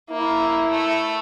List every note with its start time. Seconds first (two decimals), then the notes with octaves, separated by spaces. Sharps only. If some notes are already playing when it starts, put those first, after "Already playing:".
0.10 A#3 E4
0.70 A3